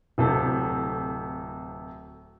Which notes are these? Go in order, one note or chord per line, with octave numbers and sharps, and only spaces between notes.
D1 C3 A4